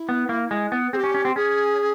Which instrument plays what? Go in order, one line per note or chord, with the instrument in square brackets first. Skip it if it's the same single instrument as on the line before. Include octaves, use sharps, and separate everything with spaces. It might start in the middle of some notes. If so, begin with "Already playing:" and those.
Already playing: [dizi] E4
[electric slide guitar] B3
A#3
G#3
B3
[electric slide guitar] C4 [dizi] G#4
[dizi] G4
[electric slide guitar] C#4
C#4
C4
[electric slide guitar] C#4 [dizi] G#4